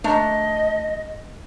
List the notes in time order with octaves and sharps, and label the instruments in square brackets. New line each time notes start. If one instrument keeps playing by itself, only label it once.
[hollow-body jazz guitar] A3 D4 A#5 [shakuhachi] D#5